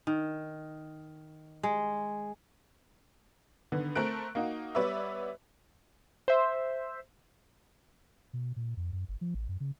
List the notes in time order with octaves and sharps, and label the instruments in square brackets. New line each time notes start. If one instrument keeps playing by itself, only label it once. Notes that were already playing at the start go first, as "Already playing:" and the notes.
[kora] D#3
G#3
[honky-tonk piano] D3 D#3 B3
A3 C4 A#4 F#6 D7
A#3 D#4 F#4
G3 B3 B4 C#5 D5 E5
[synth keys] C5 E5
[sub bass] B2
A#2
F2
F#2
G1
F3
A1
F#2
C#3